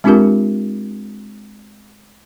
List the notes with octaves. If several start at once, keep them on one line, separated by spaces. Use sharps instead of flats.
G#3 C4 D4 F4 G4 A#4